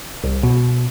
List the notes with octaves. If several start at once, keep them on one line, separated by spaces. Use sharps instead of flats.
C2
B2